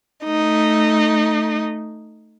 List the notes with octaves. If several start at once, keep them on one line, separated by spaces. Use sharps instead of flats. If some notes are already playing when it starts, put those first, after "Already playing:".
A3 D#4